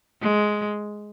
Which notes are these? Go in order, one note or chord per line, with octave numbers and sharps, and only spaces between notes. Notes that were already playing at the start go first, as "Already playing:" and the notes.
G#3